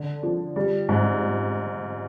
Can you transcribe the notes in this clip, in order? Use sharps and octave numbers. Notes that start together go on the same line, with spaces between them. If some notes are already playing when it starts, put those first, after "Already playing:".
Already playing: D3
F3
G3
G#2